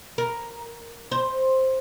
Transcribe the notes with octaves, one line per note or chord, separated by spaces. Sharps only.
A#4
C5